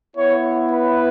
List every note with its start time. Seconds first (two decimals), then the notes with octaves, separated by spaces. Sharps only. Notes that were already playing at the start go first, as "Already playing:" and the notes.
0.17 B3 E4 C#5
0.71 B4